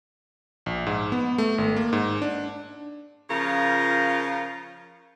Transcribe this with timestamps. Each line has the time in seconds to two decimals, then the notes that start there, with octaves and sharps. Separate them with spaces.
0.66 A#1
0.87 G#2
1.12 B3
1.38 A3
1.58 G#1
1.76 A#3
1.93 G#2
2.22 D4
3.30 C#3 F3 F4 A#4